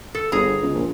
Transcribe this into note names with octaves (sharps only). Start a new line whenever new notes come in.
A4
G1 G#4 A#5
C#2
A#1